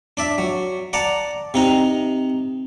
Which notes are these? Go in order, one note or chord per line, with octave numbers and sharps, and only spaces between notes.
D4 D5 E5
F#3
D5 F#5 A5 A#5
C3 D#4 A#5